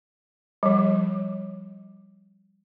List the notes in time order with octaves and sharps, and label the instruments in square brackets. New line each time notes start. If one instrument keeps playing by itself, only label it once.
[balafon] F3 G3